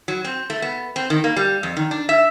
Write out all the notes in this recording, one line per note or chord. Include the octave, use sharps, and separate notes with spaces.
F#3
C4
A3
B3
C4
D#3
A#3
G3
F2
D#3
D4
E5